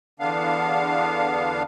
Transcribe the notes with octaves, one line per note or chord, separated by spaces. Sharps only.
E2 D3 B3 D4 F5